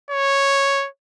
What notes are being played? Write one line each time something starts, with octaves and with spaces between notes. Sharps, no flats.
C#5